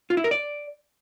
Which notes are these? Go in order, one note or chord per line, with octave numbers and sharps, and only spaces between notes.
F4
E4
A#4
D5